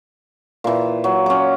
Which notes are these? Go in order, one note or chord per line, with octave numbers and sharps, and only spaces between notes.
A#2 E3
F#3
C#4 D6